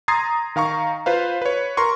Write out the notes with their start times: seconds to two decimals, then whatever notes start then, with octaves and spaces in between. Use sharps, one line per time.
0.08 A#5 C6 D#6 G#6 A6 C7
0.56 D#3 F5 A#5 C#6
1.06 F4 B4 C5 F5
1.42 B4 C#5
1.77 A#4 A#5 C6 C#6